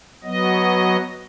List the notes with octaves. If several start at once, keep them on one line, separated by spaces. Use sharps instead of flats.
F#3 B3 D#5